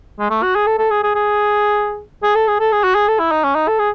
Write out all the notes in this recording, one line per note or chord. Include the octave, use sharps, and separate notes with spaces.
G#3
A3
F#4
G#4
A4
A4
G#4
G#4
G#4
G#4
A4
G#4
A4
G#4
F#4
G#4
A4
E4
D#4
C#4
D#4
A4
G#4